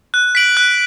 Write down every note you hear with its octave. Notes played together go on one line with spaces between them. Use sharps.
F#6
B6 D7 F#7
F#6